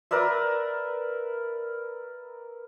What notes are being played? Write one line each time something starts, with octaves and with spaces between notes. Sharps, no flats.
A#4 B4 D5 E5